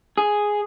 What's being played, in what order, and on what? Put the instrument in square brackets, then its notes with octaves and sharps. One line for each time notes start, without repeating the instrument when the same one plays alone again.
[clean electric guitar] G#4